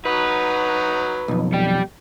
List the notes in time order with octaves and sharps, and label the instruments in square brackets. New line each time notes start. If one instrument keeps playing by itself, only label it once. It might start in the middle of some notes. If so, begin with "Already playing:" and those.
[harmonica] F#3 D#4 F#4 [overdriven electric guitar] B4
[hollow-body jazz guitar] B1 F2
[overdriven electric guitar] G3 G4